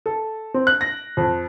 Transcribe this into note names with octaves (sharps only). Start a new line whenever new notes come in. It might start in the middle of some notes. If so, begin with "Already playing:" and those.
A4
C4
F#6
A#6
F2